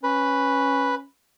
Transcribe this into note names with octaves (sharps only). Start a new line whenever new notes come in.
C#4 B4